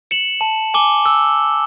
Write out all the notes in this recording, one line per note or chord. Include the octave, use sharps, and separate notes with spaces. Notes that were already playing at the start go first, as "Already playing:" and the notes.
C#7 E7 F#7
A5
G#5 D6 G7
E6